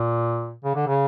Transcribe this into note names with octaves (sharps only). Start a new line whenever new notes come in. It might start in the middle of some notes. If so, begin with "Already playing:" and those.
Already playing: A#2
C#3
D3
C#3